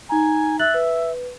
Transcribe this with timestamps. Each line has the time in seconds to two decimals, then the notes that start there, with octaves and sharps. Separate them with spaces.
0.09 D#4 G#5 A#5
0.60 E5 F#6 A6 F#7
0.74 B4